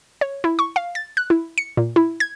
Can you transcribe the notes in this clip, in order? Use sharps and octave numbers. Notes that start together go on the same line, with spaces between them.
C#5
E4
C#6
F5
A6
F#6
E4
C#7
A#2
E4
G#6